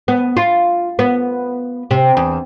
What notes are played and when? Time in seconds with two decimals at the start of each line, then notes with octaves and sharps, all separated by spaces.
0.08 B3
0.37 F4
0.99 B3
1.91 C3
2.17 E2